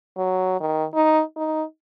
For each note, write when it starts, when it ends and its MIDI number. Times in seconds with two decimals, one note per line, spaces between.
0.17 0.57 54
0.60 0.84 51
0.94 1.22 63
1.37 1.63 63